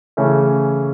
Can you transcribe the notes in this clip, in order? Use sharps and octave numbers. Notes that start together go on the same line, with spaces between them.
C#3 E3 A3 C#4